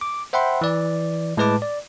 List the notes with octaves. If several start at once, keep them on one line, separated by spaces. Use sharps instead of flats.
D6
C5 E5 F#5 G5 B5 C6
E3 D5
A2 G#3 B4 A5 D6
D5